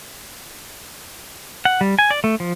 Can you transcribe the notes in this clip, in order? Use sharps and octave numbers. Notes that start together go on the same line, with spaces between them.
F#5
G3
G#5
D5
A3
F3